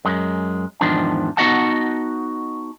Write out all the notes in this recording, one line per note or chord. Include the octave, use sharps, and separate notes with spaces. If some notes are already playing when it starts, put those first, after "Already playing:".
F#2 G#3
E2 G#2 D#3 F3 D4
B3 D#4 F#4 D#5 F#5 A5